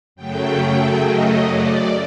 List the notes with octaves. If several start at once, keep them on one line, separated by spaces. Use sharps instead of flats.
F#2 C#3 F#3 A3 G5
G5
D#5
D5